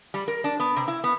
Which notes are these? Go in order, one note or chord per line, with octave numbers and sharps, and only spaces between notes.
G3
A#4
D4
B3
C3
E4
B3